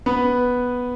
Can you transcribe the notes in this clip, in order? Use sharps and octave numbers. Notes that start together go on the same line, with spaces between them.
B3 B4